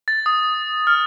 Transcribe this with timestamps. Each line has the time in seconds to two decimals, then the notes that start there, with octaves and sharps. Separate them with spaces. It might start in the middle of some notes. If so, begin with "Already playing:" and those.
0.08 A6
0.26 D#6
0.87 F6